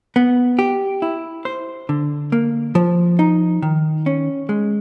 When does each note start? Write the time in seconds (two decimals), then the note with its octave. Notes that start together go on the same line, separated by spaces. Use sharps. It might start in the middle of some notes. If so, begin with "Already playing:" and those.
0.16 B3
0.59 G4
1.02 E4
1.45 C5
1.89 D3
2.32 A#3
2.75 F3
3.19 D#4
3.62 D#3
4.06 C#4
4.49 G#3